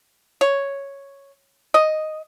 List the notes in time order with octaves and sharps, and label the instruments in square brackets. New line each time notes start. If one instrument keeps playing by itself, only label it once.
[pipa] C#5
D#5